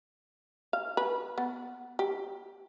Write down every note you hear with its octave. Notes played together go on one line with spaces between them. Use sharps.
F5
B4
B3
G4